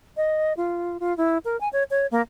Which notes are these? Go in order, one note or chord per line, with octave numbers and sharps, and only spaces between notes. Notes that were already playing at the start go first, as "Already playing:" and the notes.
D#5
F4
F4
E4
A#4
G#5
C#5
C#5
A#3